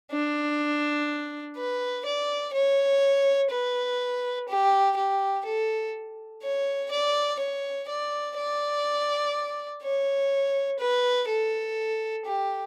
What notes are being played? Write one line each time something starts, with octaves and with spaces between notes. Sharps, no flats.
D4
B4
D5
C#5
B4
G4
G4
A4
C#5
D5
C#5
D5
D5
C#5
B4
A4
G4